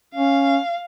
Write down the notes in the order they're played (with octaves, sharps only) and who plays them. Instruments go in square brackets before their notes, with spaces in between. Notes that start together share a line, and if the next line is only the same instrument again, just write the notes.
[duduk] C#4 [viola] F5